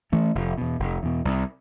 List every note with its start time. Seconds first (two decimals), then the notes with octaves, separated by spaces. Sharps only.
0.12 E3 A3 C#4
0.35 F1
0.58 E2 B2
0.79 F1
1.03 E2 B2
1.25 C2